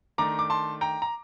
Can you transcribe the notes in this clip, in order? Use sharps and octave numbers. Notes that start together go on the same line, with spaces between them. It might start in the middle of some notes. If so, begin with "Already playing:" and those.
D#3 A3 D4 A#5 D6
D6
A5 C6
G5 A#5
A#5